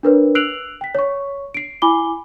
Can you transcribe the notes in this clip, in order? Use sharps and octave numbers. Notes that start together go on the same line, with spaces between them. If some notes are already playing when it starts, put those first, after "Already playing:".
D4 A#4 B4 C#5
E6 F#6 C7 D7 F7 F#7
G5 B6
C#5 C#6
C7 D7
E4 G#5 B5 D6 G7